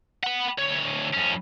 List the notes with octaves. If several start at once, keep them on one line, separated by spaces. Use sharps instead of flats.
F#5 B5
D2 C#5
F2 C#4